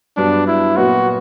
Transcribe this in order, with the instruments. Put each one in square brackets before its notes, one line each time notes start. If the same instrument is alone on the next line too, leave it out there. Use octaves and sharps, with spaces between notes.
[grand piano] G2 F#3 B3 [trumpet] D4
[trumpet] E4
[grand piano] A#2 F#3 B3 [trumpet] F#4